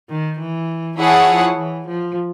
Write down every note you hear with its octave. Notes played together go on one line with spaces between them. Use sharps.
D#3
E3
E3 E4 G#4 C#5 F#5 A5
F3
E3
F3